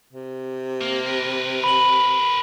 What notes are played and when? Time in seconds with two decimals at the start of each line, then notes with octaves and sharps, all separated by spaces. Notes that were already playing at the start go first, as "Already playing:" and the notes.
0.13 C3
0.81 A#3
1.07 A#4 B4
1.64 B5 F#7